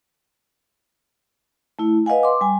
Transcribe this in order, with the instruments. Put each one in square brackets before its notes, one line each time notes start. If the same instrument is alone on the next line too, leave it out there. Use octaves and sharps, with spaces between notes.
[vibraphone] A3 E4
B4 D#5 F5 F#5 G#5
C6 D6
G3 G#5